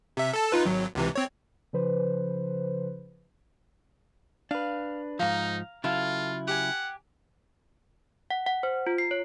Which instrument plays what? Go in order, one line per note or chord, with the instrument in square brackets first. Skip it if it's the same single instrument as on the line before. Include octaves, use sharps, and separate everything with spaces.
[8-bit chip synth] C3 E5
A4 A5
D#4 F4 B4
G#1 F#3
C#2 C3 E3
C4 C#5
[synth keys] C#3 F3 B4 C5
[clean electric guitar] D4 B4 [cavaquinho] F5
[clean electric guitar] G#2 F3 [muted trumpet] D#4 [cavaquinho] F5 A#5
[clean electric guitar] C#3 F#3 E4 [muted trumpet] F4 [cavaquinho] A4 F5
[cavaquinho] G4 G#5 [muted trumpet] F#5
[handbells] F#5
F#5
C5
F4
C7
C#5